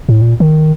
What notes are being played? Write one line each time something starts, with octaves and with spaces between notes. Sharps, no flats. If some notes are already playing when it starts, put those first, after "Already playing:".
A2
A#2
D#3